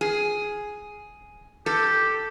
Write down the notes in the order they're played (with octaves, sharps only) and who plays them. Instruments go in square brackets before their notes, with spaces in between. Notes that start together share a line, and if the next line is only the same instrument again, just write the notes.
[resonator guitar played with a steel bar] G#4
[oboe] G4 [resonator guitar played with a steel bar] A4